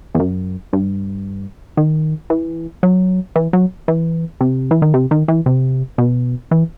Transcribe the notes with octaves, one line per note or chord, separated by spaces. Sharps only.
E2
F#2
G2
D#3
E3
F#3
E3
F#3
E3
C3
E3
D#3
C3
D#3
E3
C3
B2
E3